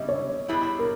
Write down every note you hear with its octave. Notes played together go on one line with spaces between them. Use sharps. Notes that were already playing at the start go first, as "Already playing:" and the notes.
Already playing: C#3 G3 C#4 E4 D#5 E5
C#5
B2 G3 B3 E4 G#4
A#4